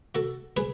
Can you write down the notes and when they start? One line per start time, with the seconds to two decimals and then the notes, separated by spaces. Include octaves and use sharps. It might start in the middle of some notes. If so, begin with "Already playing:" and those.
0.15 F#4 A4
0.57 G#4 B4